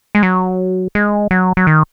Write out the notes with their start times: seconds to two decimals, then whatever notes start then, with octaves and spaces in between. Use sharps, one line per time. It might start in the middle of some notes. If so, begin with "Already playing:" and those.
0.15 G#3
0.23 F#3
0.95 G#3
1.31 F#3
1.57 F#3
1.67 D#3